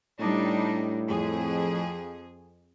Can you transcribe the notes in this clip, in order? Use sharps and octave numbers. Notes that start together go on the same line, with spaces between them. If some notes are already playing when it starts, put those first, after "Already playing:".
A2 G3 D4 D#4
F2 G#4